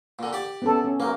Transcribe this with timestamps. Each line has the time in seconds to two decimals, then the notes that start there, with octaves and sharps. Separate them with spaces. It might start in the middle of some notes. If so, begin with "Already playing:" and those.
0.19 A#2 D3
0.33 G4 D5
0.62 B3 C#4 A4
0.84 C#4
1.00 B1 A#3 A#4